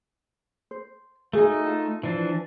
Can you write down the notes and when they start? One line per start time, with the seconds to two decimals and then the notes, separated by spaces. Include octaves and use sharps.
0.71 C5
1.33 A3 D#4 F#4 G#4
1.66 F4 A5
2.03 E3 F3 D4